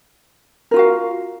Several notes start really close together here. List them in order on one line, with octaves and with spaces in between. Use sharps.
A#4 F4 F#4 F5